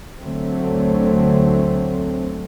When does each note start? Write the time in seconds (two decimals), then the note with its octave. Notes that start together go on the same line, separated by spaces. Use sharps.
0.21 D2 D3 F#3 A3 C4